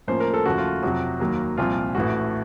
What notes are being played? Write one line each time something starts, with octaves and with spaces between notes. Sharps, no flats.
A2 F3 A#3 C#4 C5
A#4
A4
D#2 C#3 F3 A3 F#4
F4
F2 C3 F#3 F#4
D#2 D#3 F#3 A#3
C2 A#2 F3 C4 F4
A1 A2 A3 F#4